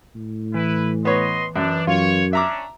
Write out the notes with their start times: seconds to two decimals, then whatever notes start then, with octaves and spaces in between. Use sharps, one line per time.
0.15 A2
0.54 E3 E4 B4
1.05 B3 C#5 D#5 C6
1.56 F#2 D4
1.87 F#2 F4 C#5
2.33 C#4 D4 E5 A#5 D6